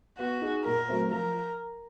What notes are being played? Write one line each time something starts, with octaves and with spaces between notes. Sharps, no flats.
B3 F#4
D#4 G#4
A#2 A#4
F#3 A3 C4
F3 A#4